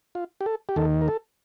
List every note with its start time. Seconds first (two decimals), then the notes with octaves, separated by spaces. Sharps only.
0.15 F4
0.41 G4
0.46 A4
0.69 G4
0.76 D#2 D#3 A4
1.01 A#4
1.08 A4